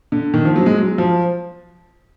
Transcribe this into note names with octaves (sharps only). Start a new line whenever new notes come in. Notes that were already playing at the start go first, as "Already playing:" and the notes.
D3
D#3
F3
F#3
G#3
F#3
F3